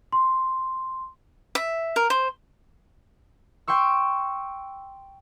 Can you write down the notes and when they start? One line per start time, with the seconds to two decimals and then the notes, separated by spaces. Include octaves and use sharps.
0.13 C6
1.55 E5
1.96 A#4
2.10 C5
3.68 G5 C6 C#6 E6